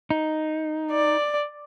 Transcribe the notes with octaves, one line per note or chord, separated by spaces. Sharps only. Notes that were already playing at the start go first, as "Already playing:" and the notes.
D#4
D5